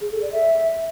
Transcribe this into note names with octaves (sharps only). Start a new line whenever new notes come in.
G#4
A4
D5
E5